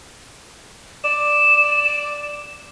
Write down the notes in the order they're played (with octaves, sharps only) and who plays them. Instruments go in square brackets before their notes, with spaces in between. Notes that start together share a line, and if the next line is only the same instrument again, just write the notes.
[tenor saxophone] D5 [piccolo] E7